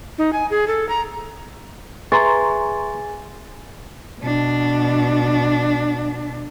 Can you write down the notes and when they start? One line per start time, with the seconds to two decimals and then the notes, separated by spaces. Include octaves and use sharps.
0.18 D#4
0.33 G#5
0.50 G#4
0.68 A4
0.89 A#5
2.12 G#4 B4 E5 G#5 A#5 C6 C#6 A6
4.21 B2 D4